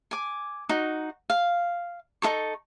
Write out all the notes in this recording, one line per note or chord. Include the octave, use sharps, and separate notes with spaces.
G#5 D6
D#4 F#4
F5
D#4 F4 A4 C#6